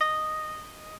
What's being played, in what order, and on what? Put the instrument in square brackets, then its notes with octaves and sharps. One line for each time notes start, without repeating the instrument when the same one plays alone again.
[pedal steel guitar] D#5